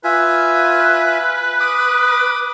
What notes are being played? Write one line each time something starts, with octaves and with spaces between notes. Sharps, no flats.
F4 B4 E5 G#5
D6 D#6